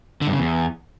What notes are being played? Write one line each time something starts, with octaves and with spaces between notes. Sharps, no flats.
D3
G2
C#3
E2